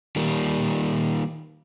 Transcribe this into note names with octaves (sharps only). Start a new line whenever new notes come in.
D#3 G3 A#3